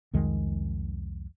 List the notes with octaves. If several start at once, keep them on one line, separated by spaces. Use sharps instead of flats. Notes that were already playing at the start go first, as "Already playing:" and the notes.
C2 F2 D#3 G#3